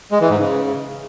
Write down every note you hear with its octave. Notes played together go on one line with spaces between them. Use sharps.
G#3
E3
G#2
C#3